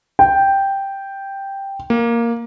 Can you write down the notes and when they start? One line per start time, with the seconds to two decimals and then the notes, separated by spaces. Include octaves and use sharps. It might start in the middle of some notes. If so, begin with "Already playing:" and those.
0.19 G5
1.90 A#3